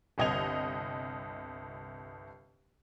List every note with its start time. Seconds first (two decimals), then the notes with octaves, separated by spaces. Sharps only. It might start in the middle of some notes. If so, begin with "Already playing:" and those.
0.18 G1 C2 D#5 G#6 F7